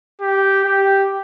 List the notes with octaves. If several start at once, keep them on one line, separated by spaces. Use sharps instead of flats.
G4
G4